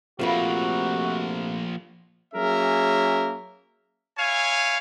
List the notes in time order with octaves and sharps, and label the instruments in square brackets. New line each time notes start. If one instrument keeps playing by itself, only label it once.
[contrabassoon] C3 [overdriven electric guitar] F3 A#3 [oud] A3 F4 B4 [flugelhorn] F#4
[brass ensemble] F#3 A#3 C#4 G#4 A#4 E5
[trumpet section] E4 C#5 F5 G#5